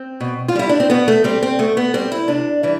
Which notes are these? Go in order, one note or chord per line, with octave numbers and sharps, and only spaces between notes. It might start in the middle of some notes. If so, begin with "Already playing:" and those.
Already playing: C4
B2
F4
G3 E4
D4
C4
B2 B3
A3
G3 C4
C4
B2 A3
B3
G3 C4
E4
C3 D4
E3 G3